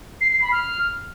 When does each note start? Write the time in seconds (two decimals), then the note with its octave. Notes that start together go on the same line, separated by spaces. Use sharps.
0.21 C7
0.31 C7
0.42 B5
0.52 F6